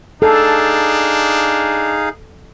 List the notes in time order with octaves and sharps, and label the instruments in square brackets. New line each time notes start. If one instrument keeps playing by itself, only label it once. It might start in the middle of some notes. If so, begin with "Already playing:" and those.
[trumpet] D4 [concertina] D#4 G#4 F5 [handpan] A4